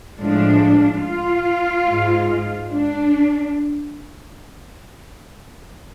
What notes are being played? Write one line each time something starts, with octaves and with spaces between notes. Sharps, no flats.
A2 F3 G#3 D4
F4
G#2 G#3
D4